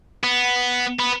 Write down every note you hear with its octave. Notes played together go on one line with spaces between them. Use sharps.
B3
B3